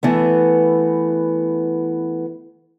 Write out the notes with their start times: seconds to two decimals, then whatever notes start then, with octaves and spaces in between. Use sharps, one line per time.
0.03 E3 A3 B3